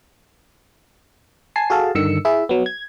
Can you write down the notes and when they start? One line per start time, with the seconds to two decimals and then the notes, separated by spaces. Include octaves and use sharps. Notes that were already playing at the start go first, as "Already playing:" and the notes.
1.56 G#5 A5 C7
1.70 F#4 G#4 A4 F5 A5
1.95 G2 D3 D#3 E6 C#7
2.25 E4 G#4 E5
2.49 F#3 B3
2.66 G#6